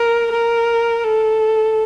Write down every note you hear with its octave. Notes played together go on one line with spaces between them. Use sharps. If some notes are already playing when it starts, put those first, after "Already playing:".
Already playing: A#4
A#4
A4